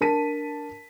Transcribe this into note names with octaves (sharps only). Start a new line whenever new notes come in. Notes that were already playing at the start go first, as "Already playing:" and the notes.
D4 A#4 A5 B6 D#7